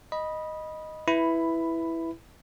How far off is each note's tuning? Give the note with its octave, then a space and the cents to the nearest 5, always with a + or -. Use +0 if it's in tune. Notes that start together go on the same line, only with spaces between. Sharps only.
D#5 +0 B5 -15
E4 +0 B4 +0 B5 +10